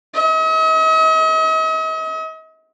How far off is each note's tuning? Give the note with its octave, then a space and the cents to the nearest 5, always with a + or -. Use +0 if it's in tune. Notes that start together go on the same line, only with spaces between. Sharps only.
D#5 +45